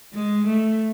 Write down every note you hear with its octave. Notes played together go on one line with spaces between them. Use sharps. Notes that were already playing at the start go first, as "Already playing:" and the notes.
G#3
A3